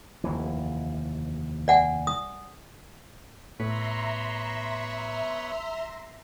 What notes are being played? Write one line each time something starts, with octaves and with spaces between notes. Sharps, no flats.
F1 D#2 E3
D5 F#5 G#5
D#6
A2 B3 B4 C#5 E5 A#5 C6